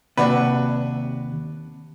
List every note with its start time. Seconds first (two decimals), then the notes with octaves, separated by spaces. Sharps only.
0.17 D#2 C3 D4 F#4 B4